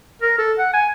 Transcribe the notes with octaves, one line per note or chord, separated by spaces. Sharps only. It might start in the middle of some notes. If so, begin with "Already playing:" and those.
A#4
A4
F#5
G#5